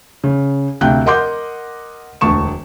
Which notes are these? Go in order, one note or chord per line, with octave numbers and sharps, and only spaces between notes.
C#3
D2 C3 F5 G5 F#6 G6
A#4 D#5 F#5 C6 D6 G6
E1 D2 A5 C#6 E7